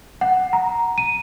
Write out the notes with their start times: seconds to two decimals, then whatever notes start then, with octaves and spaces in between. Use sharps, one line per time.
0.21 F#5
0.53 A#5
0.98 D#7